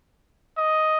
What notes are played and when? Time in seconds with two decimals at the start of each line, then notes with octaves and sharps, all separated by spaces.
0.58 D#5